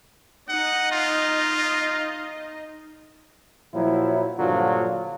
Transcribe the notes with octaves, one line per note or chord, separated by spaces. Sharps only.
D#4 D#5 F#5
F4
A#2 F3 F#3 E4
G2 A#2 D3 F3 F#3 F4